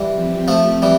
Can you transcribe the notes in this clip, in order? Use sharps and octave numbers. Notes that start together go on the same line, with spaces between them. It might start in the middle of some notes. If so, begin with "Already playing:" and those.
Already playing: E3 G3
F3 C4 G4
F3 A3
E3 G3